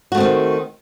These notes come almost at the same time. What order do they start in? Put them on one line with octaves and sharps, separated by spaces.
F#4 A3 C4 D#3